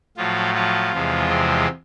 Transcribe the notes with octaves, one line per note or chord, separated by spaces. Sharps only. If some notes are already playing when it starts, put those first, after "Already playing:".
A2 F3 F#3 F4
F3 F4
E2 C3 F3 G#3
C3 C4